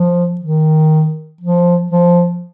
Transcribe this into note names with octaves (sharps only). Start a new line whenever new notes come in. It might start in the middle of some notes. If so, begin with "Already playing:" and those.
Already playing: F3
D#3
F3
F3